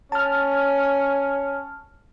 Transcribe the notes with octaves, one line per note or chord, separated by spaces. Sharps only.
C#4 A5 F6